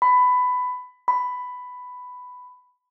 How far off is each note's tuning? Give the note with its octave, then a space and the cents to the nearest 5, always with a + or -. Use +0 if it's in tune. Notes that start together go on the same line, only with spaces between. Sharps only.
B5 +15
B5 +10